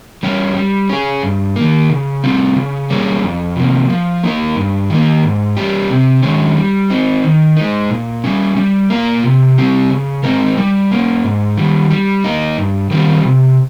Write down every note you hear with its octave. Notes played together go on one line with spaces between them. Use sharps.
G3 C#4 G4
G3
C#4 G#4
G2
D#3 A#3
C#3
G3 C4 F4
C#3
G3 A#3 C#4 G#4
F2
C3 F3 A#3
F3
A#3 D#4 A#4
G2
D#3 A#3
G#2
G3 C#4 G4
C3
D#3 G#3 C#4
G3
C4 D#4
D#3
G#3 D#4
A#2
G3 C#4
G3
A#3 F4 A#4
C3
G3 C4 G4
C#3
G#3 C4 D#4 A#4
G3
A#3 C#4
G#2
D#3 G3
G3
A#3 D#4
G2
D#3 G3 C4 F4
C3